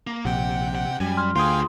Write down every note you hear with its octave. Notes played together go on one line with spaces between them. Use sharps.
A#3
A#1 C3 F#5 G5
F#5
F#2 G3 G#5
C6 F6
D2 F4 G#4 F5 G5 G#5 C6 D#6